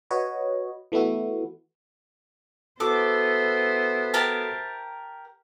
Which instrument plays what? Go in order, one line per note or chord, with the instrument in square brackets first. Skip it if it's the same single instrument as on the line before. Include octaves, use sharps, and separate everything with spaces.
[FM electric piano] F#4 B4 C#5 D#5
E3 A3 B3 E4 F#4
[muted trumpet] B3 [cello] E4 C5 [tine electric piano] F#4 A4 [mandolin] D6
[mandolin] G4 A#4 A5